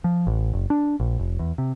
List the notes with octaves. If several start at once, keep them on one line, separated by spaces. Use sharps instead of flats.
F3
A1
F#1
D4
A#1
F1
E2
C3